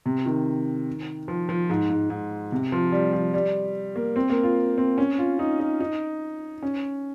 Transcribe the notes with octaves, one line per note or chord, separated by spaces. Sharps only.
C3
D#3
F3
F3
G#2
G#2
G#2
C3
F3
G3
F3
G3
A#3
C4
A#3
F4
C4
C#4
F4
D#4
D#4
D#4
C#4